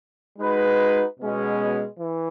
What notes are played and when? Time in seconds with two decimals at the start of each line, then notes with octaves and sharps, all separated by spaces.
0.39 G#3 D#4 F#4 B4
1.19 B2 G#3 C#4
2.00 E3